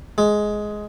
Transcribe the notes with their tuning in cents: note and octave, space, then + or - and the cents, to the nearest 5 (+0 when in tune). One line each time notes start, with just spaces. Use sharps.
G#3 +10